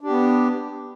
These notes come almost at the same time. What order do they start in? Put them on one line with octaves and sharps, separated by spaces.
D4 G4 B3